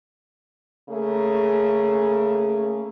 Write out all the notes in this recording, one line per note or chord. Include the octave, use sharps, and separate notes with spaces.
C#3 A3 A#3 G#4